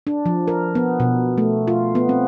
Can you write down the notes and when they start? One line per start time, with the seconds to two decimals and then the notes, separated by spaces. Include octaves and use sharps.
0.07 D4
0.26 F3
0.48 A#4
0.75 B3
1.00 B2
1.38 A3
1.67 F4
1.95 B3
2.09 C4